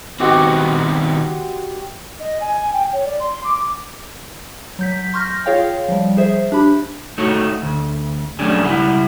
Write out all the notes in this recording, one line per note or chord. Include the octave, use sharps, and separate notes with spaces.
D#3 G#3 B3 C4 F#4 G4
D#5
G#5
G5
C#5
D5
C6
D6
F#3 G6 B6
C6 C#6 F6 G6 A#6
F4 G#4 C#5 F5 G5
F3 G3
G#4 C5 E5
D4 G4 B5
A3 D#4 F#4 C#5
D2
F#3 G3 A3 C#4 D4 G#4
C#2 G3 E4 F#5